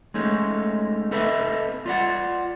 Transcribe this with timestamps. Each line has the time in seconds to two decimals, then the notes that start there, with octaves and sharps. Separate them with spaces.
0.14 G#3 A3 C#4 D#4
1.11 C4 A4 B4 D#5 E5
1.86 F4 D5 F#5